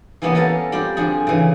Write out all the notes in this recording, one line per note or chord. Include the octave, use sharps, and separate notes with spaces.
E3 G3 A#3 B3 C#4
B3 A4 A#4 F5 A5
G3 C4 F4 G4
D3 F3 G#4
C#3 E3